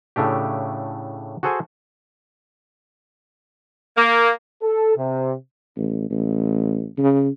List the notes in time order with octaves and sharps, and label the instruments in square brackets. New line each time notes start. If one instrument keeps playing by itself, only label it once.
[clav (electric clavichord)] A2 C#3 A3 D4 G4
F#4 G#4 A4 C5 F#5 G#5
[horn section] A#3
[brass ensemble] A4
C3
[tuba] A1
A1
C#3